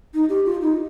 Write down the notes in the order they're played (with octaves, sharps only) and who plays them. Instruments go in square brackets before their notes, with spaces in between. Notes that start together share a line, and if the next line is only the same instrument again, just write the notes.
[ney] D#4
G4
F4
D#4